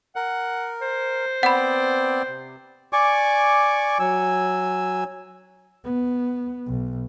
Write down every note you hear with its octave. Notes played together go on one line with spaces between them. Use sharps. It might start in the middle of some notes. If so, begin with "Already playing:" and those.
A#4 F#5
C5
B3 C4 D5 F#5 B5
C3
D5 G#5 C#6 D6
F#3 G#5 E6
B3
B1